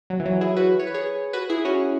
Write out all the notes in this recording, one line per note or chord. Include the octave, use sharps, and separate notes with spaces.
F#3
E3
F#3
E4 G#4
F#4 B4
C#5
B4
G#4 C#5
F#4 B4
E4 G#4
C#4 F#4